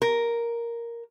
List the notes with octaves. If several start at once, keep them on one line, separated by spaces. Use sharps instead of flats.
A#4